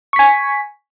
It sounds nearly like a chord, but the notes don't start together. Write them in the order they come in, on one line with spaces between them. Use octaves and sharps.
C#6 B6 G#5